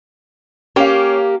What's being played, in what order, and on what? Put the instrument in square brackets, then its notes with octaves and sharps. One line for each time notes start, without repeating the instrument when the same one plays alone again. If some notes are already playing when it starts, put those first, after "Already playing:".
[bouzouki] A#3 G4 [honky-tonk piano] C#4 F5